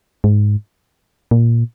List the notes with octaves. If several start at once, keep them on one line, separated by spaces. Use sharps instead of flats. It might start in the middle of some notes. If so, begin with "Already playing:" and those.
G#2
A#2